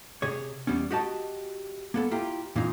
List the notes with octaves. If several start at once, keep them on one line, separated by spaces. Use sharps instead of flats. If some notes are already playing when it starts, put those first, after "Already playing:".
C3 G#4 C#5
E2 G3 B3 C#4
F#4 G4 D#5 A5
A#3 B3 A4
E4 F4 G4 A#5
A#2 E3 C4 D#4